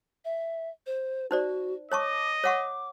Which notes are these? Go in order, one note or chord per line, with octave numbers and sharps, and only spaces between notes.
E5
C5
D#4 F#4 C5 D5
C#5 D#5 A5 C#6 D6
C#5 F#5 C#6 D6